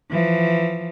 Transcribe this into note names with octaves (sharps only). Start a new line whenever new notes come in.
E3 F3